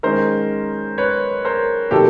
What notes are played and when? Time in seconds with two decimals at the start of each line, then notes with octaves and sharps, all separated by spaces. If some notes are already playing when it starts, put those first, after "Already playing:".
0.03 D#3 G#3 C#4 A#4 C5
0.98 B4 C#5
1.45 A#4 C5
1.91 C3 D#3 F#3 A#3 G4 A4